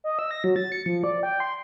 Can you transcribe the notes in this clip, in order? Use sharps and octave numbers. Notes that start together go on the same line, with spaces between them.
D#5
E6
A#6
F#3
A6
C#7
F3
D5
G5
C6